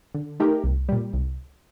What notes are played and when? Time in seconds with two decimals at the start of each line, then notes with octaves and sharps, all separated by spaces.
0.15 D3
0.40 A3 D#4 G4 A#4
0.64 C2
0.89 A#2 G3
1.13 C2